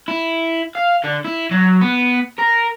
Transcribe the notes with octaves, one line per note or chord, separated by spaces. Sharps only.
E4
F5
D3
E4
F#3
B3
A#4